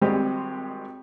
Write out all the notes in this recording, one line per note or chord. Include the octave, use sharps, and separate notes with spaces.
G#1 G3 G#3 C4 G4 D#5